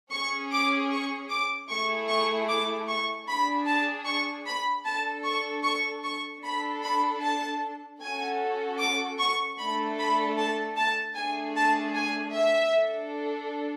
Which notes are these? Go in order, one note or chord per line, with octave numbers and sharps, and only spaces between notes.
C#4 G#4 C#6
D6
C#6
D6
A3 E4 G#4 C#6
C#6
D6
C#6
D4 G#4 B5
A5
C#6
B5
D4 A4 A5
C#6
C#6
C#6
D4 A4 B5
B5
A5
C#4 F#4 A4 G#5
D6
C#6
A3 D4 A4 B5
B5
A5
A5
A3 D4 G#4 G#5
A5
G#5
E5
D4 A4